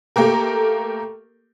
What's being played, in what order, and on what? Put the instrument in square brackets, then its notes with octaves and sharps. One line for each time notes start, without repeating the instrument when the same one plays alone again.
[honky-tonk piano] A3 A#3 G4 A#4